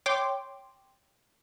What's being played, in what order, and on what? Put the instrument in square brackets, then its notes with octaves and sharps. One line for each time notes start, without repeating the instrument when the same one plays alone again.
[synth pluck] C#5 G5 C6 D6